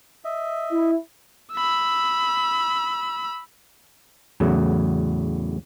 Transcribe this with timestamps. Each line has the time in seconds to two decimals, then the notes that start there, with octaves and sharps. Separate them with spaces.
0.24 D#5 E5
0.71 E4
1.53 B5 E6
4.40 E2 A2 C#3 F#3